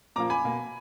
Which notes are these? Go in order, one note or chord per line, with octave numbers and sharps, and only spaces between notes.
A#2 F3 A#3 A#5 D6
G#5 B5
B2 A#3